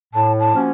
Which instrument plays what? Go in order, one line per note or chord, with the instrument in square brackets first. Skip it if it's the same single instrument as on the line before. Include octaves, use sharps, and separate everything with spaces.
[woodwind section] A2 [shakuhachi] A5
[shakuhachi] A5
[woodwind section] F3 A#3 C#4 F#4